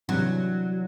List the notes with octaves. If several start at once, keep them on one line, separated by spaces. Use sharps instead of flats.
C3 E3 F#3 G3 D4